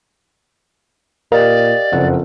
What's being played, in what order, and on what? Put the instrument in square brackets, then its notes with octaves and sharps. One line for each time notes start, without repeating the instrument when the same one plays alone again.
[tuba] A#2 [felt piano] G4 D#5 F5 [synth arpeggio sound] A#4 [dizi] D5
[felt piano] F#1 F#5 [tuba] F2